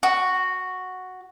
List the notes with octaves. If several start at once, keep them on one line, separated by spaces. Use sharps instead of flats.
F#4